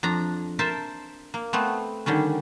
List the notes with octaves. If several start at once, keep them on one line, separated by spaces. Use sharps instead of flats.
F2 D4 A#5
A#4 C5 E5 A5
A#3
A3 B3 C4
D3 D#3 G3 C#4